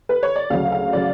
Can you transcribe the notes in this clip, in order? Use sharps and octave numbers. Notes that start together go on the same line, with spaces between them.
B4
C#5
D5
D2 C#3 F#3 F5
F5
C#3 F#3 D5